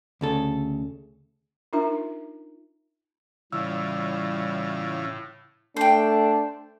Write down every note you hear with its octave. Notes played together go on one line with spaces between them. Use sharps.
D2 C#3 A4
D4 D#4 F4 A#4 E5 A#5
A2 C#3 E3 G3 F4 E6
A3 D4 C5 G5